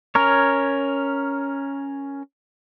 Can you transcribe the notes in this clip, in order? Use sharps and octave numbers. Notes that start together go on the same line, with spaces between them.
C#4 A#4 C#5